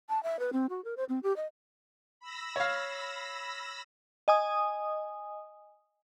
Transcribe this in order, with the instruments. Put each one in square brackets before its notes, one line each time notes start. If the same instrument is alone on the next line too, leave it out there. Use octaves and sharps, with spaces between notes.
[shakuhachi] A5
E5
B4
C4
F#4
A#4
C5
C4
G4
D#5
[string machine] B5 E6 A#6
[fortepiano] C#5 F5
[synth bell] D#5 G#5 D#6